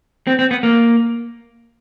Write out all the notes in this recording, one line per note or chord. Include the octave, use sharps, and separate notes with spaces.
C4
C4
B3
A#3